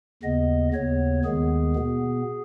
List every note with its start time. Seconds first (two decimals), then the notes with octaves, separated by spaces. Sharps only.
0.23 D#2 C#3 B3 D#5
0.74 D#2 C#3 B3 C#5
1.25 D#2 D#3 G#3 B3 G#4
1.76 B2 B3